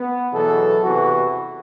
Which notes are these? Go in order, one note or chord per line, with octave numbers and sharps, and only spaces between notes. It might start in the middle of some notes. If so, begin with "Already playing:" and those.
Already playing: B3
E2 B2 F#3 A4
E2 C3 E3 F#4